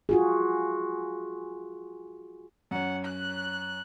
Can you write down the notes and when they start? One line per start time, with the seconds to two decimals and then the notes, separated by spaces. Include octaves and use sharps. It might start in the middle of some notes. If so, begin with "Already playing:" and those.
0.09 F4 F#4 G#4
2.71 F#2 C#4 F#5
3.04 F#6